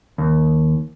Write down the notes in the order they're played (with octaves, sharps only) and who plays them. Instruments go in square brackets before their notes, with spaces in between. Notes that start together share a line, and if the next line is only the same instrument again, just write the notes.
[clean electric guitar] D#2